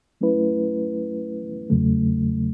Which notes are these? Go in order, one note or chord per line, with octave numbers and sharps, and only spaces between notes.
F#3 A3 C#4 E4 B4
E2 C#3 F#3 A3